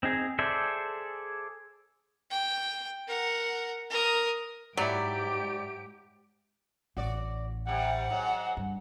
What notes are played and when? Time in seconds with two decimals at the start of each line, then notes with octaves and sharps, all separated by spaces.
0.03 C4 D#4 G#4
0.39 G#4 A4 C5 D5 E5
2.31 G5
3.08 A#4 F#5
3.91 A#4 D#6
4.77 G#2 F#3 E4 G4 D5 D7
6.97 A1 A2 F#4 D5
7.67 C3 G3 F#5
8.10 G#2 F#3
8.57 G2